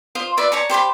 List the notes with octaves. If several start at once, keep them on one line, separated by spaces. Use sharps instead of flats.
F4 C5 C6 D#6
F4 B4 D5 E5
C#5 A5 A#5 C#6
G4 C5 A5 B5